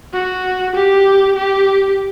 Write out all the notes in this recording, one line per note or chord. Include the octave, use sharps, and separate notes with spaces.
F#4
G4
G4